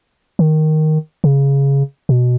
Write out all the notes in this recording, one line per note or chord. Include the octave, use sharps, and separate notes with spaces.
D#3
C#3
B2